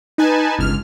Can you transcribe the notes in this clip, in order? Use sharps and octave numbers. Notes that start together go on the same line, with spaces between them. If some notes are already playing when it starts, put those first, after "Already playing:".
D#4 B4 G#5 A5
G1 C#2 F6